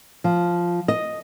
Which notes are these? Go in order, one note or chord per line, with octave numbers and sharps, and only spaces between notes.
F3
D#5